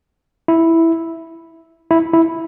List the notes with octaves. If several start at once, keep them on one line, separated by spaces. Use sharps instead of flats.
E4
E4
E4